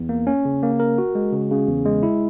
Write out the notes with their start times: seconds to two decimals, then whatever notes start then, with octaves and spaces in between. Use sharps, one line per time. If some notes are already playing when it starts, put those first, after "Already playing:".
Already playing: E2
0.09 A#3
0.27 C#4
0.45 C#3
0.63 A#3
0.80 A#4
0.98 F#4
1.15 G#3
1.33 C#3
1.51 C#3
1.68 E2
1.85 G#3
2.03 E4